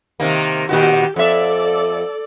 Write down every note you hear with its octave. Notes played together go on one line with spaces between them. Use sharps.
C3 D#3 A#3
A#2 D#3 F#4 G4
F2 A4 D5 E5